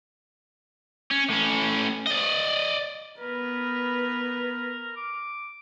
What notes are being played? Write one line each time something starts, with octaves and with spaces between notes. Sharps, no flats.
C#4
A2 C#4
D5 D#5
B3 A#4 B4
D6